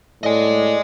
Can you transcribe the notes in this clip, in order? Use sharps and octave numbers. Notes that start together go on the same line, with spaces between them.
A2 D5 D#5 G#5